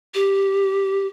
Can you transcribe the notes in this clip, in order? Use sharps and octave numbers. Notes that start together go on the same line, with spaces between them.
G4